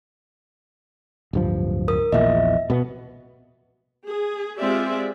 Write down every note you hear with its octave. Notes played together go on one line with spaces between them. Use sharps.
D1 G2 F3
A#4 D#6
A#1 E2 A#2 D#5 E5
B2 B3
G#4
G#3 C4 F4 G4 D5 E5